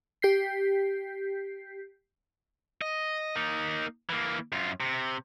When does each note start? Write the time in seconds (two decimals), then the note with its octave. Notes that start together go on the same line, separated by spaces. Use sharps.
0.22 G4 G6 B6 C7
2.81 D#5
3.36 A#3 D#4
4.10 E3 A#3
4.52 F#2 F4
4.80 C3